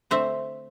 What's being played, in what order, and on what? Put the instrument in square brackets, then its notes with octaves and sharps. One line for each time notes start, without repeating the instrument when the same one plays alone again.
[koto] D3 A3 C4 C5 E5